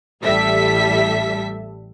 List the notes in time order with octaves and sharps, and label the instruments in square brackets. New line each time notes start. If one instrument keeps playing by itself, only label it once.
[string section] A1 G3 A4 E5 B6